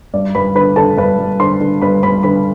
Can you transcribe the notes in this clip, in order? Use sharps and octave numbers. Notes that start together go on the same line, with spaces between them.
G2 D5
G2 B4 B5
D3 B4 B5
D3 A4 A5
G2 B4 B5
G2
D3 C5 C6
D3
G2 B4 B5
G2 B4 B5
D3 B4 B5